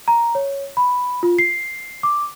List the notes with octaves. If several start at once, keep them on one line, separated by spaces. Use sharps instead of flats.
A#5
C#5
B5
F4
C7
D6